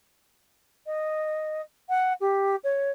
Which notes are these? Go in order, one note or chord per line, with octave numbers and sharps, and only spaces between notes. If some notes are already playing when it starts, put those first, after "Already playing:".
D#5
F#5
G4
C#5